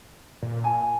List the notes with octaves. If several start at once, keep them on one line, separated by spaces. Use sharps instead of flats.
A#2
G#5 A5